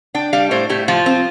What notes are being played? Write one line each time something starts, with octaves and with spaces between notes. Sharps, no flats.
D4 G5
G3 F5
A2 C5
A2 G4
F3 F4
C4